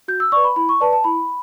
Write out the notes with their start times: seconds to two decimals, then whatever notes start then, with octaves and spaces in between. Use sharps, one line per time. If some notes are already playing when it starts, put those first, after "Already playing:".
0.08 F#4 G6
0.20 E6
0.32 B4 D5 C#6
0.44 B5
0.56 E4 B5
0.69 C#6
0.80 B4 D5 A5
0.93 A5
1.04 E4 B5